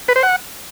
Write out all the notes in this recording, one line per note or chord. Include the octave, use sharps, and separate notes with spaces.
B4
C5
F#5